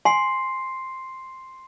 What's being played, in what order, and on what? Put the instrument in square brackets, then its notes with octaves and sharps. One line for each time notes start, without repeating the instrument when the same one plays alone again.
[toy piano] G#5 [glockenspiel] C6 C7